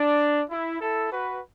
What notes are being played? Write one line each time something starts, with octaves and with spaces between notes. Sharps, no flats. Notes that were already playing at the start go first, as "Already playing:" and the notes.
Already playing: D4
E4
E4 A4
F#4 B4